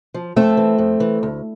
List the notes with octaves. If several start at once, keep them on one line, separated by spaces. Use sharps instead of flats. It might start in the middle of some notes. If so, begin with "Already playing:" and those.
F3
F2 A3 C4
E3
F2
E3
D2